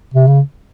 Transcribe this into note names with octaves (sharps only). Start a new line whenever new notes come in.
C3
C#3